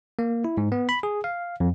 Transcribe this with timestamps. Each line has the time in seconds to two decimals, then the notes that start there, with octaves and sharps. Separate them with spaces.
0.19 A#3
0.44 E4
0.57 G#2
0.72 B3
0.89 B5
1.03 G#4
1.24 F5
1.60 F2